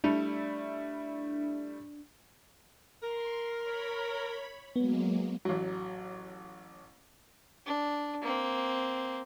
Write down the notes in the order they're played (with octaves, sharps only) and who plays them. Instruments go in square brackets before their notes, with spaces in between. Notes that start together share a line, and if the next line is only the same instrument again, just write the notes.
[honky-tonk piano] G3 A3 E4 [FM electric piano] D4
[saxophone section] A#4 [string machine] C6
[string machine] C#5 B5
[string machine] F#3 G#3 A#3 [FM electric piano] B3
[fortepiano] A1 F#3
[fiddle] D4
A#3 C4